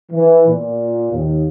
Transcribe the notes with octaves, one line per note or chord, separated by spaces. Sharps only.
E3
A#2
D#2